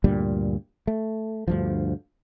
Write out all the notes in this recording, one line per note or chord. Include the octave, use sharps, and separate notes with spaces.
D2 G2 A#2 G3
A3
D2 G2 F3